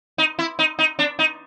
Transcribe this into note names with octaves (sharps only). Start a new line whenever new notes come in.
D#4
E4
D#4
D#4
D4
D#4